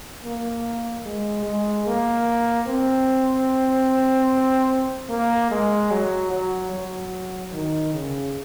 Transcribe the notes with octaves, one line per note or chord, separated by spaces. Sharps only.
A#3
G#3
G#3
A#3
C4
A#3
G#3
F#3
F#3
F#3
D#3
C#3